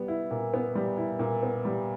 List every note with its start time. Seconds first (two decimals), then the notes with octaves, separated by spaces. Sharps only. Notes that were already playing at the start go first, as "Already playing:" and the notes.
Already playing: G3 B3
0.08 E4
0.31 A#2
0.54 B3
0.75 G3
0.97 E4
1.19 A#2
1.43 B3
1.65 G3